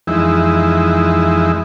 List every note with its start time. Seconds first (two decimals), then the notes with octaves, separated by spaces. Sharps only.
0.07 F2 E3 G#3 D#4 E4